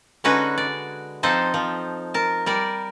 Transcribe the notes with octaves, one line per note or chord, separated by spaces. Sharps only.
D3 G#3 C#4 D#4 F#4 B4
D5
F3 C4 D#4 A4 C5
F3
A#4 A5
G3 A#4 D5